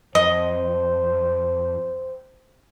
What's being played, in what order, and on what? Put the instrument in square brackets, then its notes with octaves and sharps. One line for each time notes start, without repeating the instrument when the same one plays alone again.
[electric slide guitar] F2 [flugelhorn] C5 [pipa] D#5